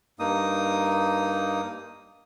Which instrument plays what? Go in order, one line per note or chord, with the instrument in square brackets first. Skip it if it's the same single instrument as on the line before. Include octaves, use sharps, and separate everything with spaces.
[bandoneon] G2 A#3 D#4 D#6